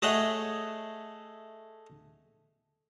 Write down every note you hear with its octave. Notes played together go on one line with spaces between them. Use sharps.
A3 G#4 C#5 D#5 E5 F#5